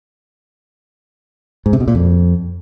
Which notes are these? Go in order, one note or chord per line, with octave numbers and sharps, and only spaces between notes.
G#2
C3
B2
A#2
F2